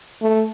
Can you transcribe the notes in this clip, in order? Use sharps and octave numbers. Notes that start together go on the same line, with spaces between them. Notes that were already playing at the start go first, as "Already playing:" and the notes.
A3